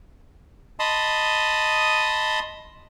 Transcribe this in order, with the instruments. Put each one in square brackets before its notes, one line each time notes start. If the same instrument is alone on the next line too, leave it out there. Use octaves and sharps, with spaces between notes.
[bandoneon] D#5 A5 B5 C6 D#6